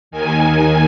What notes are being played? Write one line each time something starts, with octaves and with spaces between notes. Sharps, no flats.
D#2 D#3 G#5